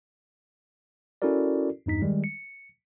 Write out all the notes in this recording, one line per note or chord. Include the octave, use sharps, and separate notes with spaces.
C#4 E4 F#4 A4 A#4 D5
E2 G2 D#4 B6
D#3 G3 G#3
C#7